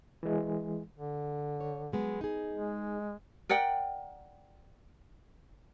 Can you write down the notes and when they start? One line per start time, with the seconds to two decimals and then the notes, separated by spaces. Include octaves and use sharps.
0.23 E3 G#3
0.97 D3
1.60 C#5
1.92 F#3 G#3 B3
2.21 D#4 G#4
2.53 G#3
3.49 A#4 D5 F#5 G5